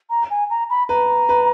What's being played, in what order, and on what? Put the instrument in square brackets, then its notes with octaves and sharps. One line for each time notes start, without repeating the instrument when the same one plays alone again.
[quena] A#5
G#5
A#5
B5
[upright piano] B4 [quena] A#5
[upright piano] B4